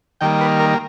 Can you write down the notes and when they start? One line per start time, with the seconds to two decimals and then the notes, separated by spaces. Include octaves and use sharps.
0.21 D#3 G3 A#3 G5
0.41 B4
0.60 A#4